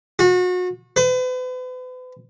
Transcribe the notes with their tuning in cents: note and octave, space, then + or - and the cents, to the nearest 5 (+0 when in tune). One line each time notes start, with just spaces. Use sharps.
F#4 -35
B4 +40